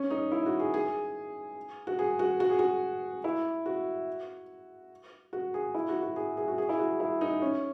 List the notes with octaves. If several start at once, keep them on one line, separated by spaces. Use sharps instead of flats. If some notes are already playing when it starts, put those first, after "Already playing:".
Already playing: C#4
D#4
E4
F#4
G#4
G#4
F#4
G#4
F#4
F#4
G#4
F#4
E4
F#4
F#4
G#4
E4
F#4
F#4
G#4
G#4
F#4
G#4
E4
F#4
E4
D#4
C#4